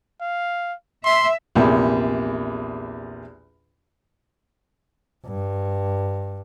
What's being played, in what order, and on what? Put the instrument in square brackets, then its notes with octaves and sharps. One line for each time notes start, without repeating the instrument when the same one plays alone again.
[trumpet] F5
[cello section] E5 [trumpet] C6
[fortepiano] A#1 E2 C3
[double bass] G2